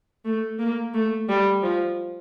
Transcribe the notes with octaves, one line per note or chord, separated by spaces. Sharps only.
A3
A#3
A3
G3
F3